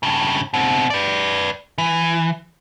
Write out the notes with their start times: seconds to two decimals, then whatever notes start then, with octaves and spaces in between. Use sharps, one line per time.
0.03 G2 C#3
0.54 B2 C4
0.90 B4 D5
1.78 E3